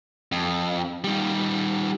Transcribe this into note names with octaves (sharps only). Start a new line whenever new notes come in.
F2
D#3 G3